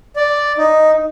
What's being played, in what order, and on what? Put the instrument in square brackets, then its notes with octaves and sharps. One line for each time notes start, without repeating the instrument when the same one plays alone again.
[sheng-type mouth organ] D5
D#4